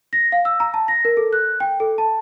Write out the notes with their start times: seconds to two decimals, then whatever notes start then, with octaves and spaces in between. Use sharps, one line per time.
0.13 A#6
0.32 F5
0.45 E6
0.60 A#5
0.74 A5
0.88 A#6
1.05 A#4
1.17 A4
1.33 F#6
1.60 G5
1.80 A4
1.98 A5